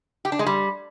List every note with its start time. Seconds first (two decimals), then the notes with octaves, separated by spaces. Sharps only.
0.25 G4
0.32 D4
0.39 G#3
0.46 G3